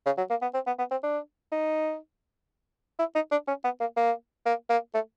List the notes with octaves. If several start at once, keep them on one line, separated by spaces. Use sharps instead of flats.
C#3
F#3
A#3
B3
C4
B3
B3
C4
D4
D#4
E4
D#4
D4
C#4
B3
A#3
A#3
A#3
A#3
A3